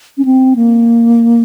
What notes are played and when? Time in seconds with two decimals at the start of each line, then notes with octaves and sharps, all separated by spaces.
0.18 C#4
0.25 C4
0.56 A#3